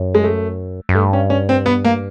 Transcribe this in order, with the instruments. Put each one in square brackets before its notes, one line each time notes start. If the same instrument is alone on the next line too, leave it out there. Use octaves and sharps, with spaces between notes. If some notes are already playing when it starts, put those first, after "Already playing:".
Already playing: [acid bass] F#2
[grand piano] G#3
A3
[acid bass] F#2
[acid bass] G2 [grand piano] A3
[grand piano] C#4
C#4
C4
B3
A#3